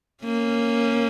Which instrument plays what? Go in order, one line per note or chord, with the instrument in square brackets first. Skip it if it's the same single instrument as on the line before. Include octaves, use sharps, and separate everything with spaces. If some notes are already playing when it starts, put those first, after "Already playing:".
[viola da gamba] A#3 C#4